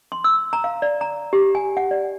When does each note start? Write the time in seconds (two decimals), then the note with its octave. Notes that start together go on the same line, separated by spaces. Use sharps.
0.12 C6
0.24 E6
0.53 A#5
0.64 F5
0.82 D5
1.01 A#5
1.33 G4
1.55 G#5
1.77 F#5
1.91 D5